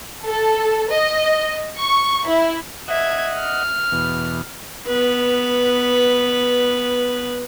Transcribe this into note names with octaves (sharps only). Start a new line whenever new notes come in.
A4
D#5
C#6
E4
D#5 E5 F#5 G#6
F6
E2 B2
B3 B4